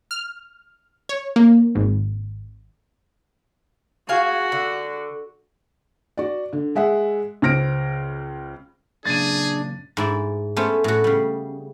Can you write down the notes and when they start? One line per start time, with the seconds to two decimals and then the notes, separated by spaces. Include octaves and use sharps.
0.11 F6
1.09 C#5
1.36 A#3
1.75 G#1
4.09 F#4 G#4 F5
4.52 D3
6.17 F#4 D5
6.53 D3
6.75 G#3 G#4 E5 F#5
7.42 C#2 C5 F6 A#6 D7
9.05 F#2 A#2 C#3 D4 G#4 A6 D#7
9.97 G#2 E4 D5
10.57 A3 B3 C#4 C5
10.84 A2 F#4
11.04 C#3 G3